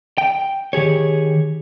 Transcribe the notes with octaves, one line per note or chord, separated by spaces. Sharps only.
G5
D#3 G4 G#4 C#5